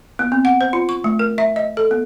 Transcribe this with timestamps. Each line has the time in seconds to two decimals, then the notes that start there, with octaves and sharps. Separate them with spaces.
0.19 B3
0.32 C4
0.45 F#5
0.61 C5
0.73 F4
0.89 C#6
1.04 A3
1.19 A#4
1.38 E5
1.56 D#5
1.77 A4
1.91 B3